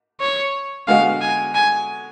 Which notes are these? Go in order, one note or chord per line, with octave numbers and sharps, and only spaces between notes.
C#5
D3 G#3 B3 F#4 F5
G#5
G#5